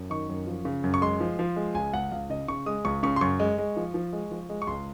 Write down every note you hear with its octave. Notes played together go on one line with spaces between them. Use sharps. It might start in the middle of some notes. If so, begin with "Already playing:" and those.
Already playing: F#2
D#3 C#6
F#2
F3
C#3
F#2
C#6
G#3 C6
F3
F3
G#3
C#2 G#5
C#2 F#5
C#2 F5
C#3 D#5
C#3 C#6
G#3 D#6
C#2 C#6
C#3 C#6
C6
F#2 C#6
G#3
G#3
F3
F3
G#3
F3
G#3
C#6
C#2 C6